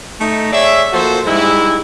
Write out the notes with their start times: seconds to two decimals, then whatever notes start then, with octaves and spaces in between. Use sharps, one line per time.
0.21 A3 D#4
0.53 G#4 C#5 D5 E5
0.93 F3 A#3 F#4 A4 C5
1.26 G#2 G3 G#3 E4